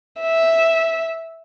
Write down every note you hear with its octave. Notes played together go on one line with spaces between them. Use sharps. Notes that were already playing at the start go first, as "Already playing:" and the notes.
E5